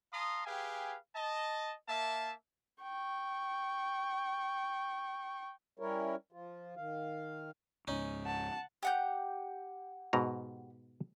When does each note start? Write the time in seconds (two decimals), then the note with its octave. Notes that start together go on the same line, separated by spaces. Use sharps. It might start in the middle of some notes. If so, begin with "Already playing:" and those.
0.12 F5 A5 A#5 C6 D#6
0.46 G4 G#4 B4 F5 G5 G#5
1.15 D#5 A5
1.88 A#3 E5 A5
2.82 G5 C#6
5.79 G3 C#4 E4 A#4 C#5
6.32 F3 F4
6.76 D#3 F5
7.87 C#2 G#2 C#4 D#4
8.24 F#5 A5
8.83 G4 F#5 G6
10.13 G#2 B2 A#5